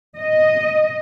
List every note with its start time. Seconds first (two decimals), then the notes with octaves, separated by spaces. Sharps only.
0.17 D#5